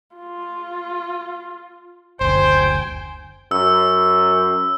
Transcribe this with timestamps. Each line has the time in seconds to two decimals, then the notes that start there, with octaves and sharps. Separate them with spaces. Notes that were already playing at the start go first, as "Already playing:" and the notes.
0.16 F4
2.21 F#1 D2 C5 G5 G#5
3.51 F#2 E6